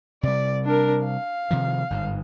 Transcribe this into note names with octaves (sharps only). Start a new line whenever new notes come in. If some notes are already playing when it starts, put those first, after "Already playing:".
C3 G3 D5
D4 A#4
F5
C3 D#3 F3
G1 G#2